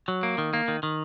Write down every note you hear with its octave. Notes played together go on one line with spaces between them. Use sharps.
F#3
A#3
D#3
A#3
D#3
D#3